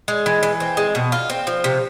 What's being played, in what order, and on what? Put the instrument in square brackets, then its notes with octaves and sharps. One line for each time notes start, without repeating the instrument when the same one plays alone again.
[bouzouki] G#3
E3
E3
C4
G#3
B2
F4
C4
F3
C3